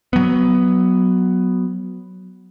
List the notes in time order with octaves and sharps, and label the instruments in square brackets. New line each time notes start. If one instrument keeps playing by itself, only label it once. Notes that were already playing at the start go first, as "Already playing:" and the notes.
[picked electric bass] F#3 B3